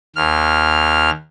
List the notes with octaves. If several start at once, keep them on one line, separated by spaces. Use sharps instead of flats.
D#2 F6